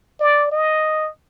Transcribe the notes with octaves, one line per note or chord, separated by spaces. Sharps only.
D5
D#5